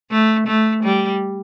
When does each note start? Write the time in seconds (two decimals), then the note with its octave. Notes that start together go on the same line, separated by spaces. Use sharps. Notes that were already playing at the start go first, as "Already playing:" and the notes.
0.11 A3
0.47 A3
0.84 G3